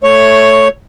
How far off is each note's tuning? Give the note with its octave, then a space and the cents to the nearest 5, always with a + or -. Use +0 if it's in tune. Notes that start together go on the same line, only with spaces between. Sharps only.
A3 +0 C#5 +0